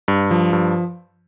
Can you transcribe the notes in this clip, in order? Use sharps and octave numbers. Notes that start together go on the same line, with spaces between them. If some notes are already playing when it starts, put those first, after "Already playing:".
G2
F3
G2